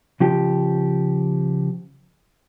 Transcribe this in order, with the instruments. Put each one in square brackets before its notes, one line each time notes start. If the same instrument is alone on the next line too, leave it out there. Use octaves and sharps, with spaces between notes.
[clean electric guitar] C#3 F3 G4